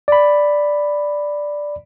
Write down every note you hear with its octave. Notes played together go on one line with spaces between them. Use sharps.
D5 B5